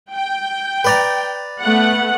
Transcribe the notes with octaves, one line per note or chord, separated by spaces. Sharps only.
G5
B4 D5 A#5
A3 B3 F#5